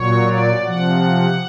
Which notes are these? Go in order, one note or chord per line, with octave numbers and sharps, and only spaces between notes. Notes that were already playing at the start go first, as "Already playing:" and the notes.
Already playing: A#2 F#3 C#5
D5
C3 F3 F#5